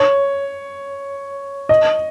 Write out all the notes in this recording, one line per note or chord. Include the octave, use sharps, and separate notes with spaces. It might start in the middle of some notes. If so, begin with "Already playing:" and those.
Already playing: C#5
D#5